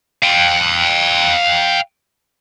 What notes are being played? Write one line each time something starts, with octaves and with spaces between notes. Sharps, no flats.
F5 G5